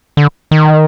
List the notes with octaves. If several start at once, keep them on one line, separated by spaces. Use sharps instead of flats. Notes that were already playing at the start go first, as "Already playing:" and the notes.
D3
D#3